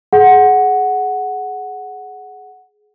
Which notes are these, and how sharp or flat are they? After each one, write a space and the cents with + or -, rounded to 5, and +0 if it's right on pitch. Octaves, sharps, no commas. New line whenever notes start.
G#4 +20 F#5 +0